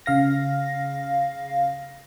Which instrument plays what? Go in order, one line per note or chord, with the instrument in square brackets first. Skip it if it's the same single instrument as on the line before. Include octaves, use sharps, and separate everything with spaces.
[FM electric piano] C#3 F5 A#6